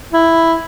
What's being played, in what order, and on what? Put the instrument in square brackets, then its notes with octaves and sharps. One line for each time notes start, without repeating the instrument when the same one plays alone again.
[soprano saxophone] E4